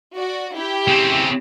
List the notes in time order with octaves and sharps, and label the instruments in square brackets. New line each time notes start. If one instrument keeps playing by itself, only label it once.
[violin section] F#4 D5
E4 G4
[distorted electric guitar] C#3 C4